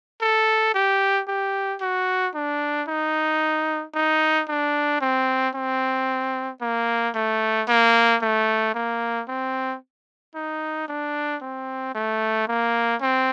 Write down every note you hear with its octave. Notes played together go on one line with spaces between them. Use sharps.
A4
G4
G4
F#4
D4
D#4
D#4
D4
C4
C4
A#3
A3
A#3
A3
A#3
C4
D#4
D4
C4
A3
A#3
C4